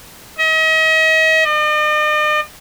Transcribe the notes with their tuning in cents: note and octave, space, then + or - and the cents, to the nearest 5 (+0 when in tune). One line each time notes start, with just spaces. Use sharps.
D#5 +40
D#5 -45